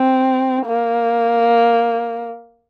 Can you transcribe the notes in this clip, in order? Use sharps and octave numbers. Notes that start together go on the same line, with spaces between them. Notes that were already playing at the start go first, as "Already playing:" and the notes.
Already playing: C4
A#3